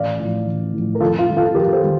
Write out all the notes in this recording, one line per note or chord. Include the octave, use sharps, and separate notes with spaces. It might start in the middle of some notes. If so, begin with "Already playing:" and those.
Already playing: A1 D5 F5
A2 F3
A1
A2 F3
A#4
F2 F4 A4
F4
D#3 G3
F4 A4
F2 G4 A#4
A4 C5
D#3 G3